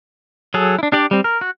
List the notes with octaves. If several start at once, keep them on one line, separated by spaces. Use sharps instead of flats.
F#3 G#4 A4
D4 E4
D4 G4 D5
G3 C4
A#4
F#4